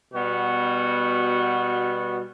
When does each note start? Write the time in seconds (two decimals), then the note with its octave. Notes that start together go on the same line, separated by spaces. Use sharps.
0.13 B2 G3 B3 F#4